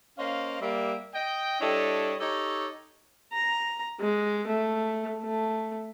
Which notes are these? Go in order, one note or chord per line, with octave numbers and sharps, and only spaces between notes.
A#3 C#4 C5 D#5 F5
G3 A#3 E5
D#5 G5
G3 D4 E4 A4 C#5 D#5
D#4 G4 A4 C#5
A#5
G#3
A3
A3